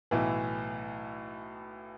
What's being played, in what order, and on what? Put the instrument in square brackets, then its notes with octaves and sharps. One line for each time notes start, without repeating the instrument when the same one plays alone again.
[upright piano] B1 A2 E3